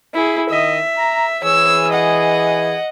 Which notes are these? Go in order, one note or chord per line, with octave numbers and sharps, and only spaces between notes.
E4 G#4
D#3 D#5 E5
A#5
E3 G#4 C#5 E6
D#5 F#5